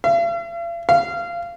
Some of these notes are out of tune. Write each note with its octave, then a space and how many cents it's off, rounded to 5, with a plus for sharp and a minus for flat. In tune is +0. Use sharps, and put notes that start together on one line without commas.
F5 -45
F5 -20